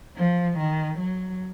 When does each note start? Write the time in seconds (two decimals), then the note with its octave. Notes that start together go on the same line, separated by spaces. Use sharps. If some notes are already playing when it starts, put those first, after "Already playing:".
0.16 F3
0.57 D#3
0.98 F#3